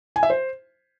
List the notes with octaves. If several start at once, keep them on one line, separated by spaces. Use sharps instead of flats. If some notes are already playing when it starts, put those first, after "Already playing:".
G#5
E5
C5